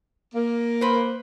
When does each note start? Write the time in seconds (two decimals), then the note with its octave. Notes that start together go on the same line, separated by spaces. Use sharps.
0.34 A#3
0.81 B4 C5